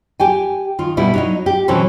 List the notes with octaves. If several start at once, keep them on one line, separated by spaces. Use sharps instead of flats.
G4 G5 G#5
D#3 F4
B2 G3 B3 E4
F#3 D#4 D#5
G4
B2 E3 F#3 C4 C#4 A4